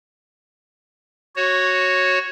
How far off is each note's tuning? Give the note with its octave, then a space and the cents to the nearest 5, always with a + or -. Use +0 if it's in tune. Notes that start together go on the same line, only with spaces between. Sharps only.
F#4 +0 C#5 -10